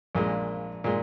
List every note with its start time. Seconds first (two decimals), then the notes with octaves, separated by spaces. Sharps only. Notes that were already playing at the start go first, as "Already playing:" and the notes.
0.15 A#1 A#2 G#3
0.84 A#2 G#3